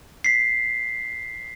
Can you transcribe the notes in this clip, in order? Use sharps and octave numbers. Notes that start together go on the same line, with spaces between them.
B6 C7